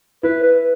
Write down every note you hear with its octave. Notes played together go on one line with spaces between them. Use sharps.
E4 B4
B4